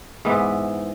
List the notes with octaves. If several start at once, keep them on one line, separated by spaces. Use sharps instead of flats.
G#2 E3 B3 E4